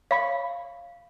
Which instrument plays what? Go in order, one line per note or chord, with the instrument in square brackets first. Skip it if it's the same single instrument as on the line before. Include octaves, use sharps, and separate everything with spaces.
[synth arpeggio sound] C#5 B5 C#6 [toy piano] F5